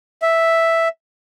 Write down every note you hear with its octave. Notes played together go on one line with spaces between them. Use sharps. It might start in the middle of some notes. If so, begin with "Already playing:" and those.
E5